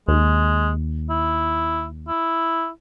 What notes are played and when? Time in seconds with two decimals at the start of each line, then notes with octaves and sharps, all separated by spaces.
0.08 D#2 G#3
1.10 E4
2.08 E4